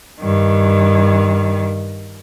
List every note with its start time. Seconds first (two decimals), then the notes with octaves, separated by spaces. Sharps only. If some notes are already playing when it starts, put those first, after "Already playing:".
0.21 G2 D#3